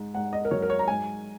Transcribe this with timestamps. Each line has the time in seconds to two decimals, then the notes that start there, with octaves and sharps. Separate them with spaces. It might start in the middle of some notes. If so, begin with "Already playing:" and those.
Already playing: G#2
0.14 G#2 F#5
0.33 D#5
0.45 A#4
0.51 F#3 C#5
0.62 A#4
0.70 C#5
0.79 A#5
0.88 G#2 G#5